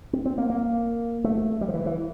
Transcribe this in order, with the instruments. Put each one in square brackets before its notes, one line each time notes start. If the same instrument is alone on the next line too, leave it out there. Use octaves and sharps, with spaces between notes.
[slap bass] C4
C4
A#3
A#3
A3
G3
F3
E3
E3